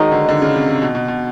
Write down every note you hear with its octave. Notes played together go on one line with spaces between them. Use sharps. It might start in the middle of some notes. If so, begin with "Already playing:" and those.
Already playing: D#3 F#3 G#3 D#4
D3
D3
C#3
C3
C3
B2
B2
B2